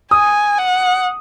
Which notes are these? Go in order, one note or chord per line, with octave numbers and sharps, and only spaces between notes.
G#5 D#6
F#5